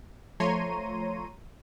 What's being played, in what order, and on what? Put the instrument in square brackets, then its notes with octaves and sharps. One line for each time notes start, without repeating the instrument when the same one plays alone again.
[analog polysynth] F3 A3 C#5 A#5 C6 D#7